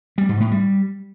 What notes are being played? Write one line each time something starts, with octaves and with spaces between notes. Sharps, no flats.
G3
G#2
A2
G3